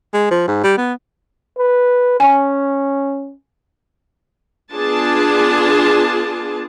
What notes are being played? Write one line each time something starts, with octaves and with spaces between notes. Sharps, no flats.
G#3
F3
G#2
G3
B3
B4
C#4 G#5
B3 D4 F4 G#4 A5